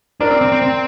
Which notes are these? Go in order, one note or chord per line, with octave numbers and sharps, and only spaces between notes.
D4 A#4 D5
C4
C4
C4
C4